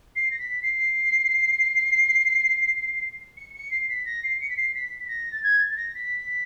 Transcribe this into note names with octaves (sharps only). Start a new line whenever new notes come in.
C7
A#6
B6
C7
C#7
C#7
C7
B6
A#6
C7
C#7
B6
C7
B6
B6
A#6
A6
G#6
A6
A6
A#6
B6